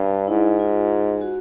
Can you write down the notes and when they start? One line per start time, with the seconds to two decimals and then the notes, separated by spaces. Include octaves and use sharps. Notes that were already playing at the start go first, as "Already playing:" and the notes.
Already playing: G2
0.27 G#2 E4
0.59 F4
1.21 F#4